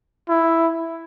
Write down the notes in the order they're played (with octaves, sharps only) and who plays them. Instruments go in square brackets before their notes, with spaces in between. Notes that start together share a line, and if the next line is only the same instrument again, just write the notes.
[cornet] E4